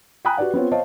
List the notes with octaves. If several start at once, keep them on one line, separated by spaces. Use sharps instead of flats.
G5 G#5 A#5 B5 D#6 F#6
F#4 G4 B4 D5 F#5
B3 C4 F4 C#5
C5 C#5 D#5 F5 A5